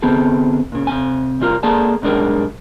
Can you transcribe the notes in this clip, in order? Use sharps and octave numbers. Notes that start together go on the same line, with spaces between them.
D3 B3 C4 G#4 A4
A#2 C#3
C3 C4 G#5
C3 G3 F4 A#4
A#3 G#4 A4 D5 A5
B1 G#2 G3 D4 G#4 A#4